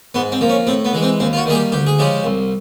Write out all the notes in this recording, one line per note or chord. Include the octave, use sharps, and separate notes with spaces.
G#2 B3
C4
F3 A#3
C#4
A2 C4
B3
E3 G#3
C4
D#2 C4
F4
F#4
D#3 G3 A#3 G#4
G4
D2 G4
G#4
C#3 F3 G#3 G4
C2